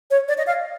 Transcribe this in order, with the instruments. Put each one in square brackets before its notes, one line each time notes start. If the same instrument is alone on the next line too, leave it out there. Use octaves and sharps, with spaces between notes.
[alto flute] C#5
D5
D#5
F5